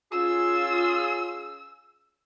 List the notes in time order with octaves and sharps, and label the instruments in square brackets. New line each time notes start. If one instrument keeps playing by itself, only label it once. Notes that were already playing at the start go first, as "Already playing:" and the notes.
[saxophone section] C#4 G#4 [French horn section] F4 [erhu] E6